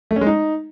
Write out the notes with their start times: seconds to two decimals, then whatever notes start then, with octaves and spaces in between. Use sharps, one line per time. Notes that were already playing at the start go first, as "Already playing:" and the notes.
0.11 A3
0.16 C#4
0.21 G#3
0.27 D#4